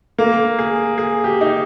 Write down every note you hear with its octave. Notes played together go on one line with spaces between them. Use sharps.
A#3
G#4
G#4
G4
D#4